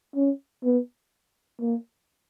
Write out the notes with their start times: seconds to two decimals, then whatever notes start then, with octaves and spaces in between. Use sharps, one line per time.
0.16 C#4
0.64 B3
1.60 A#3